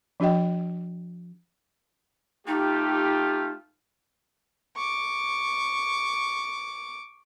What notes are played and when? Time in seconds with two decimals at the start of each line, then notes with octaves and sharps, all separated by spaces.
0.20 F3 D4 F#4 D#5 G5
2.47 A3 D#4 F4 G4
4.76 C#6 D6